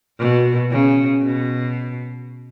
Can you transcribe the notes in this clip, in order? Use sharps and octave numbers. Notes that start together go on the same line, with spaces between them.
B2
C#3
B2